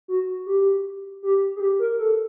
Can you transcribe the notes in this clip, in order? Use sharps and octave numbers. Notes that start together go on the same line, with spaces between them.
F#4
G4
G4
G#4
G4
A#4
A4